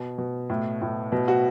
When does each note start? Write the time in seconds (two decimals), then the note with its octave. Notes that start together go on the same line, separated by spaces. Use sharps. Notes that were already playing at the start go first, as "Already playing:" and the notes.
Already playing: B2
0.18 B2
0.50 A2
0.82 A2
1.12 B2
1.28 F#4